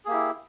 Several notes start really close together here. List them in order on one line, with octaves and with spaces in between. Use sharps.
G#4 A#3 G4 E4